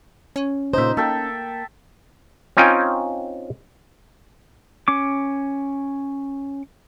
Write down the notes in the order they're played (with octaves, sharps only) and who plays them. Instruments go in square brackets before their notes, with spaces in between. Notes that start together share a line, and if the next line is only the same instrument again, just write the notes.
[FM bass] C#4
[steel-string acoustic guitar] A#2 C#3 C5 [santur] D#4 E5
[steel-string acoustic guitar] A#3 [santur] A4 E5 G5
[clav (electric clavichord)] C4 C#4 D#4 F4 G5 G#5
[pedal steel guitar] C#4 D6